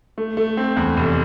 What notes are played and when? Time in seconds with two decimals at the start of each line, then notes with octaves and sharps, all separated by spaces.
0.18 A3
0.37 A3
0.57 C4
0.77 E2
0.97 F1